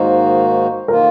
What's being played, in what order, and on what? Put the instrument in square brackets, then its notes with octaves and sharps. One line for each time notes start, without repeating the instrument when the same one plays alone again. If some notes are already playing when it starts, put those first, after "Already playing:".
Already playing: [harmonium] G#2 D#3 A#3 D#4 F#4 [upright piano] C5
[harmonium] D#3 A#3 F4 [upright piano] A#4